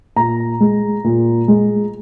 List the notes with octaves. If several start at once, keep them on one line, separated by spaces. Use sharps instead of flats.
A#2 A#5
G#3
A#2
G#3